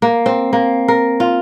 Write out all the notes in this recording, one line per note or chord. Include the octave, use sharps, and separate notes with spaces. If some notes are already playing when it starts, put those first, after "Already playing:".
A#3
C4
A#3
A#4
F4